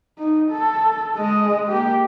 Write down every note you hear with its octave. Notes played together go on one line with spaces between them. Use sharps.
D#4
A4
G#3 D#5
A#3 G4